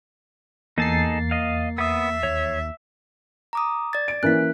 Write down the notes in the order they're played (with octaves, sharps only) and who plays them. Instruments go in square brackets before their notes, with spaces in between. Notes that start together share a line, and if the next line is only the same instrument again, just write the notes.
[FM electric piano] E2 A6 C7 [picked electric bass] A#3 [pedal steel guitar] D#4 G#4 A4
[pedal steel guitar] D#5 F5
[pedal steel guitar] B3 D#6 [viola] E5
[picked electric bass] D#2 [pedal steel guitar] C#5
[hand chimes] A#5 D6 D#6
D5 A6
[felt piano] D7
[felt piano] E3 A#3 C#4 [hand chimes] F#6 B6